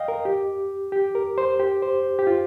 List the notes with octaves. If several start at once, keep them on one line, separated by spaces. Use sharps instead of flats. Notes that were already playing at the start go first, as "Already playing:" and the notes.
Already playing: D#5 F5 G5
A#4
G4
G4
A#4
C5
G4
C5
G4
F4